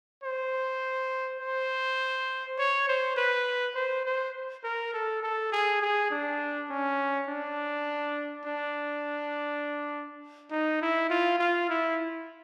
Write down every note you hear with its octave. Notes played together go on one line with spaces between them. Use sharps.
C5
C5
C#5
C5
B4
C5
C5
A#4
A4
A4
G#4
G#4
D4
C#4
D4
D4
D#4
E4
F4
F4
E4